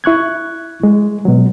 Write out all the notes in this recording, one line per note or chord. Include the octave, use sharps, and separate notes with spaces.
E4 C#6 F#6 G#6
G#3
B2 F#3